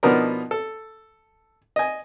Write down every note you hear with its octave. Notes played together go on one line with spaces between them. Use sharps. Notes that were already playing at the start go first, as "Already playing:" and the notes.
B2 F3 B3 D4 D#4 A#4
A4
D#5 G#5